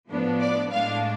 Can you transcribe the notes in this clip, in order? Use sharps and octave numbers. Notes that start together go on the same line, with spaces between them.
A2 F3 B3 D4
D5
A2 G#3 D4 F5